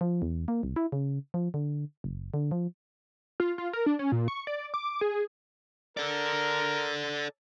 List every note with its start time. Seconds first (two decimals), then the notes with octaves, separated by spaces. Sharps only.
0.01 F3
0.22 E2
0.48 A#3
0.63 C2
0.76 E4
0.92 C#3
1.34 F3
1.54 D3
2.04 F#1
2.34 D3
2.51 F3
3.40 F4
3.58 F4
3.73 A#4
3.86 D4
3.99 C#4
4.12 A#2
4.28 C#6
4.47 D5
4.74 D6
5.01 G#4
5.97 A4 A#4 D5